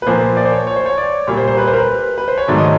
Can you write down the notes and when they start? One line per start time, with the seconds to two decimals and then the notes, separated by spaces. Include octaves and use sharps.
0.02 B4
0.07 A#2 F3 A#3 C5
0.37 D5
0.45 C5
0.52 C#5
0.67 C#5
0.76 C5
0.86 C#5
0.98 D5
1.27 A#2 G3 A#3 C#5
1.37 C5
1.48 C5
1.57 B4
1.67 C5
1.73 A#4
1.78 B4
2.18 B4
2.28 C5
2.38 C#5
2.48 G#2 D#3 F#3 A3 D5
2.58 D#5